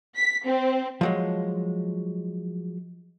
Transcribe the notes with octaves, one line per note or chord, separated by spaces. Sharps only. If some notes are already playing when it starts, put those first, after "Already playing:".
B6
C4
F3 F#3 G#3